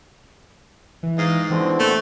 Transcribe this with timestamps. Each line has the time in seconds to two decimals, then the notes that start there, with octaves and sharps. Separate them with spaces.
1.03 E3
1.18 G#2 D#5 F5
1.50 B2 D3 E3 C4
1.79 A#2 A3